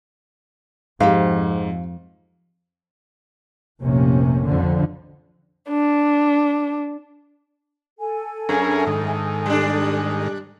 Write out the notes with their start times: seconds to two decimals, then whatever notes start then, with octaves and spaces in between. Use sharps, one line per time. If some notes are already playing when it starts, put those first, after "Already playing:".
1.00 F2 G#2 G4 C5 F5
3.82 F1 A#1 C3 A#3 C#4
4.45 F2 D3
5.69 D4
7.99 A4 G#5
8.49 F#2 C#4 G#4 A#4
8.87 G#2 D#3
9.46 G3 D4